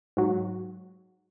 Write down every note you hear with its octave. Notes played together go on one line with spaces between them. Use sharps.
G#2 F#3